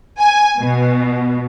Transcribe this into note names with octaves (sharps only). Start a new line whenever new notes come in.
G#5
B2